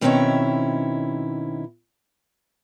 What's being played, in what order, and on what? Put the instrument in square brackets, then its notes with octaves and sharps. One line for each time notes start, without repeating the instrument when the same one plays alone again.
[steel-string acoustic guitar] B2 D#3 C4 C#4 E4 C#5